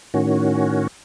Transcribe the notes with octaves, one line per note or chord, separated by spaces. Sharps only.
A2 D#3 C#4 F#4